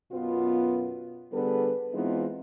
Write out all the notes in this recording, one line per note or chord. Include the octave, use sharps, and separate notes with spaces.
F#2 B2 B3 F4
D3 G3 B3 G#4 A4 B4
E3 G#3 B3 C4 D#4 F4